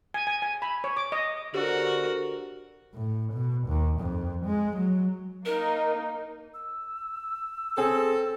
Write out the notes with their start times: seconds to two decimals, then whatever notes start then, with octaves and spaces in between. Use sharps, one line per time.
0.14 G#5
0.27 G#5
0.42 G#5
0.62 B5
0.84 C#5
0.97 D6
1.12 D#5
1.54 D3 F#4 G4 A#4 C5
2.94 A2
3.32 B2
3.68 D#2
4.00 F2
4.45 G#3
4.76 F#3
5.46 A#3 D#4 A#4
6.54 E6
7.78 C4 G#4 A4